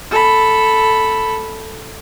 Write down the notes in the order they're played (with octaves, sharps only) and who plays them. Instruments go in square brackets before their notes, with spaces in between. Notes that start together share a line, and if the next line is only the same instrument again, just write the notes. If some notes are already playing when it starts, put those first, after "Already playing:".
[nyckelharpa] A4 B5